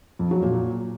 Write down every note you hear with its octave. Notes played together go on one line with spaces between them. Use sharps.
F2
F#3
A#2